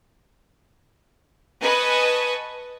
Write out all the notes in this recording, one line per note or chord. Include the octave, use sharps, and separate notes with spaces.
B4 D#5 G#5 A5 C#6 D#6